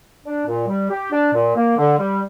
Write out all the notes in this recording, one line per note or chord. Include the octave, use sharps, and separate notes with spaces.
D4
A#2
G3
G4
D4
A#2
A#3
D3
G3